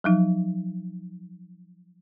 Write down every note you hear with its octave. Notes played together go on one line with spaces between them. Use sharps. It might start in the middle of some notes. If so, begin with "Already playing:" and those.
F3 F#3 D#4